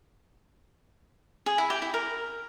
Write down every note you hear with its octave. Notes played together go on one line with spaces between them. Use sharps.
G#4
E4
G4
E4
A#4